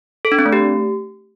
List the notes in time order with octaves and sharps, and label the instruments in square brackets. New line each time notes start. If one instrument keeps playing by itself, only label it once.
[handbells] A4
D4
C4
A3
G4